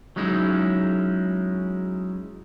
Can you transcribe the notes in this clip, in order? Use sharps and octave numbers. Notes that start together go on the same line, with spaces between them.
F#3 G#3 C#4 D#4 E4